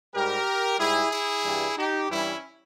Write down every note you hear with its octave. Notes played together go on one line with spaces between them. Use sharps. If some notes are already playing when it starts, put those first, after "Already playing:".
G#2 G3 G4 A#4
G#2 G3 E4 G#4
E4 G#4
G2 E3 G3
D#4 G4
G2 E3 G3 C#4 E4